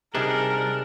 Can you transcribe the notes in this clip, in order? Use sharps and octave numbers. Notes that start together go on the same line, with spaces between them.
C3 G3 D4 D#4 G#4 A#4